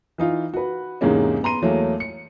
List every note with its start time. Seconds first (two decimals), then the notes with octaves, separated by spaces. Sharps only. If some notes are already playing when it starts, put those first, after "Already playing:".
0.18 E3 D#4 F4
0.54 F#4 B4
1.01 E2 G#2 C3 G#3 A#3 C#4
1.43 B3 A#5 C6 D#7
1.62 E2 F#3 A3 A#3
2.00 C#7